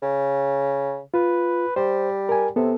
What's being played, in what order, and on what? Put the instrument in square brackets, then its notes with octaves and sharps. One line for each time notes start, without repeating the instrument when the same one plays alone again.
[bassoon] C#3
[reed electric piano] F4 [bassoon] B4
[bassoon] G3 [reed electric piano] C5
[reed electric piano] A#4 G#5
[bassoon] C3 [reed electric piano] B3 A4